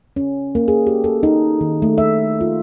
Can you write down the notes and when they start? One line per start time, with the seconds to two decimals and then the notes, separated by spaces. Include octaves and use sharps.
0.16 C#4
0.55 A#3
0.68 G#4
0.87 G4
1.04 A4
1.23 D#4
1.61 D#3
1.82 A3
1.98 E5
2.41 F4